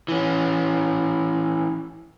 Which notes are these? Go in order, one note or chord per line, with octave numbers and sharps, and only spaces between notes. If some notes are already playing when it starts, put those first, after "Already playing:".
E3 C#4